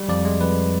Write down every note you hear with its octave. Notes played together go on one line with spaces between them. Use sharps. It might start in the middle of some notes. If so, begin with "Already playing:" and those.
Already playing: G3
F2 D5
G#3
F2 B4